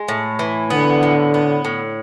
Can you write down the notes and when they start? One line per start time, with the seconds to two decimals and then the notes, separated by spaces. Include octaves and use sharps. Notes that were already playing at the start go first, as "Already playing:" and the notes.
Already playing: G#3
0.08 A2
0.39 E3
0.70 D3 B3
1.03 A2
1.34 B3
1.65 A2